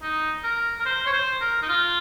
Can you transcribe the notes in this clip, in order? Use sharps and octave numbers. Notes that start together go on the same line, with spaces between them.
D#4
A#4
A#4
C5
C#5
C5
A#4
D#4
F4